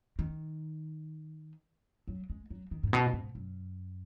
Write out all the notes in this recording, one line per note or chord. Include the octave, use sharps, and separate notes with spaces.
D#3
F#3
G#3
F#3
D#3
G#2
B2
G#2
F#2